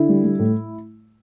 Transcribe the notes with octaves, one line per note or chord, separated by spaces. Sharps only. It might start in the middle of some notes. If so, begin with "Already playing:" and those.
Already playing: D3 E4
G3
G3
A2